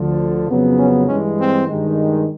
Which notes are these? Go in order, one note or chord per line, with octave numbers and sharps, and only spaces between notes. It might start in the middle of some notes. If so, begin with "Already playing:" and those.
Already playing: D2 D3 F3
F2 C#3 F#3 B3
C#4
G2 E3 G#3 C#4
C4
G2 D#3 G#3